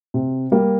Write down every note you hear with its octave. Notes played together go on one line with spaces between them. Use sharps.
C3
G3 A#3